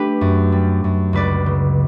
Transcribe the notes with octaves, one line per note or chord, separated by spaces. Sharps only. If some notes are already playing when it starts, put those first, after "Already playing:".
Already playing: A3 D4 G4 B4
F#2
G3
F#2
C#2 B4 D5
C#3